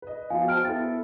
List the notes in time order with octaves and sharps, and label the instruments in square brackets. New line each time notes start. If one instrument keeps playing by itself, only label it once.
[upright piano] B4 D#5
[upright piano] F3 B3 F#4 [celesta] F5 G#5
[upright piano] F#4 C5 A5 [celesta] G5 F6 D7
[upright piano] B3 E4 A4 [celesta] A6